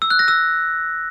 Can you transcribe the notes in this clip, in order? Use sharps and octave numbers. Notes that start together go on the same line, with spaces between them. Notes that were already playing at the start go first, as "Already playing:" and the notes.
E6
F#6
A#6
E6